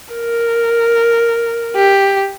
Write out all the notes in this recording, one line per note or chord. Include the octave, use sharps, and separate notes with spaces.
A#4
G4